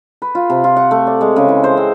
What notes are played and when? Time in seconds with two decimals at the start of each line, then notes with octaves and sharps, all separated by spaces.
0.22 B4
0.35 F4
0.50 C3
0.64 F4
0.76 F#5
0.91 A3
1.07 D5
1.21 G#3
1.36 C#3
1.48 E3
1.64 C5
1.77 C4